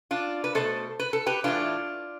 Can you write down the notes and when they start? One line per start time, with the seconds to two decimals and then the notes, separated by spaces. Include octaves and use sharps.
0.11 D4 F4
0.44 B4
0.55 B2 A3 A4 C5
1.00 B4
1.13 A4
1.26 G4 B4
1.44 A2 E3 A3 D4 F4